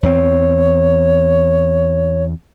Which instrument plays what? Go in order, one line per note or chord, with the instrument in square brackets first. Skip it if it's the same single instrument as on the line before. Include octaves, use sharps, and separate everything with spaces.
[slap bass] E2 C4 [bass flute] C#5